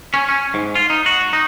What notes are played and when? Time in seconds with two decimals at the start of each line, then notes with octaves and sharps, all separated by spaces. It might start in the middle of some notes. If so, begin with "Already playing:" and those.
0.14 C#4
0.29 C#4
0.54 G#2
0.75 F4
0.90 D#4
1.06 F#4
1.33 D#4